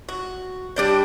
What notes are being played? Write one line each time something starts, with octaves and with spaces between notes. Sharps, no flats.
F#4
G3 D4 G5